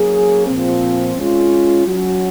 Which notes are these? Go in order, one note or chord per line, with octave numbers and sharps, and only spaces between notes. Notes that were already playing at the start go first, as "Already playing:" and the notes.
Already playing: F#3 A#3 C#4 G#4
A#2 F3 C4
G#3 C#4 F4
F#3 C#4 F#4